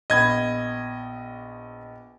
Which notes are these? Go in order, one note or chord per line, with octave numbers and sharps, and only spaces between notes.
A#1 B3 D#5 B5 G#6